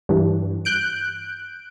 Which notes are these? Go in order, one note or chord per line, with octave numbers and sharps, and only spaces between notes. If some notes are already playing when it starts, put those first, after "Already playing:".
G2 E3
F#6 G6 D7